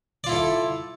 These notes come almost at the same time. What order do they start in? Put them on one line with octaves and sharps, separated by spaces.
D5 F4 E4 A4